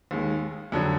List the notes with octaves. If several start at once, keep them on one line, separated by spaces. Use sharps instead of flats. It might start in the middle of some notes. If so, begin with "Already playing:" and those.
D#2 D#3 G#3
F2 D3 F#3